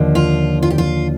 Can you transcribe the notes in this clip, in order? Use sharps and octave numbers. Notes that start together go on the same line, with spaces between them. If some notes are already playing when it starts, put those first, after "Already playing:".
Already playing: D#2 D3 F3
F4
F4
G4
F4